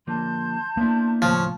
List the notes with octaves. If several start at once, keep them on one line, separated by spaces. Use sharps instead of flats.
D3 F3 A#3 A5 C6 G6
A#3 B3 D4 E4
D#2 A2 C#3 F3 C#4 A5 C6